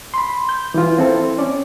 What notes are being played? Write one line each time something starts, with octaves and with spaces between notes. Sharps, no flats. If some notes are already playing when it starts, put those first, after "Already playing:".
B5 C6
G6
E3 E4 F4
C4 E4 A4
C#4 D5